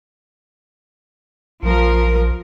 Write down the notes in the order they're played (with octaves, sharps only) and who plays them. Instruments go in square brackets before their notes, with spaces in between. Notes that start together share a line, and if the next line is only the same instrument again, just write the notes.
[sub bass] A#1 [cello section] F3 A#4